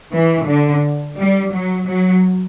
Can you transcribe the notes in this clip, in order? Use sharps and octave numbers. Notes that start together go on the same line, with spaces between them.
E3
D3
G3
F#3
F#3